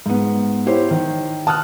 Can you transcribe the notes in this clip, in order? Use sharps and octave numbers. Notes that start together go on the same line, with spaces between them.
G#2 B3
E4 G4 C5 C#5
D#3
A5 D#6 F6 F#6